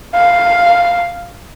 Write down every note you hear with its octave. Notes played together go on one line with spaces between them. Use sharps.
F5